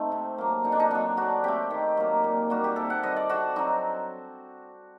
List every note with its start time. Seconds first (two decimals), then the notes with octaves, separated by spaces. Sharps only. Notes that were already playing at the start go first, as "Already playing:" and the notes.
Already playing: A3 C4 D#4
0.12 C3
0.38 F#3 A#3
0.64 D3 D#4
0.72 D4
0.80 D#4
0.91 F#3 C4 D4
1.17 D3 F#4
1.44 A3 C4 G4
1.71 D#3
1.97 F#3 A#3
2.24 A#2
2.50 G3 A#3 F#4
2.64 G4
2.76 C3 A4
2.90 F#5
3.03 G3 C4 D#5
3.16 D5
3.29 D3 F#4
3.56 F#3 C4 D#4